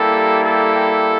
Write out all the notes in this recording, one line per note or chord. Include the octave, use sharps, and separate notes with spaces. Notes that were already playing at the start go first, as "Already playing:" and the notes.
Already playing: G3 A#3 E4 G4 A4
A4